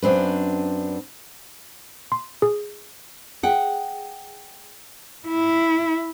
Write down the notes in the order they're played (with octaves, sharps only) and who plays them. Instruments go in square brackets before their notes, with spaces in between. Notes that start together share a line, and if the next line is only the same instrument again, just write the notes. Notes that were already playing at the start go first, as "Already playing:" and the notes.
[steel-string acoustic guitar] F#2 C4 D4 B4
[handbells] C6
G#4
[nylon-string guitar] G#4 F#5 G5
[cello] E4